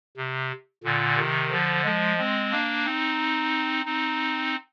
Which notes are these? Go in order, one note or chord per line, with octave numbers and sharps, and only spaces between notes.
C3
A#2 D3
C3 D#3
D3 F3
F3 G#3
G#3 C4
A#3 D4
C4 D#4
C4 D#4